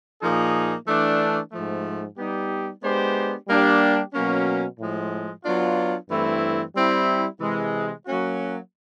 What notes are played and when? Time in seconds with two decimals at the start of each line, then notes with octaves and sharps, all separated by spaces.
0.22 A#2 F3 A#3 D#4 G#4
0.87 E3 A3 D4
1.53 G#2 F3 A3
2.18 G3 B3 D#4 G4
2.83 G#3 B3 D4 G4 C5
3.48 G3 A#3 D4 G4
4.13 B2 F#3 A#3 C#4
4.79 A2 F3 G#3
5.45 F#3 B3 D4 F4
6.10 G2 E3 A3 C4 E4
6.75 G3 C4 E4
7.40 C3 E3 G#3
8.06 F#3 A#3 C#4 F#4